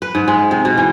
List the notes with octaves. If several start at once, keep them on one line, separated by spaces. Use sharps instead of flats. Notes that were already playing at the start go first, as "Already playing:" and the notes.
B4
G#2
G#3
C3
B2
E3